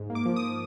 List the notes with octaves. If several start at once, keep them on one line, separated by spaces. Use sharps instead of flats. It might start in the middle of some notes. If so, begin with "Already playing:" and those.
Already playing: G#2
A#3
D6
F3
D#6
F3